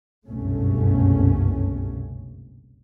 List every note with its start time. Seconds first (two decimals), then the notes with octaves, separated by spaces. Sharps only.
0.27 F#1 C2 G2 B2 A3 C#4